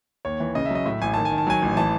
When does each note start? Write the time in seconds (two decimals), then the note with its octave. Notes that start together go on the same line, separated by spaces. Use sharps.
0.25 D#2 C#5
0.40 E3
0.55 C#3 D#5
0.66 E5
0.70 F#3 D#5
0.86 A2 E5
1.02 A1 G#5
1.14 D#3 A5
1.25 G#5
1.31 D#3
1.38 A5
1.47 F#3 G#5
1.62 A1
1.77 E3 A5